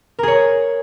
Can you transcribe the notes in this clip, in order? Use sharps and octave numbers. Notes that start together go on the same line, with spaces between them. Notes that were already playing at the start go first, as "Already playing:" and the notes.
G#4 A#4 C#5